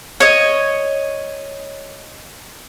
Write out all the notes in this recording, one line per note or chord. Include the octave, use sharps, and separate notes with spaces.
C#5 D#5